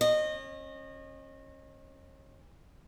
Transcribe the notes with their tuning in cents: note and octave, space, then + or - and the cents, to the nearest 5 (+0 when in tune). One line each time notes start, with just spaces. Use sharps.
C#4 -40 D#5 -20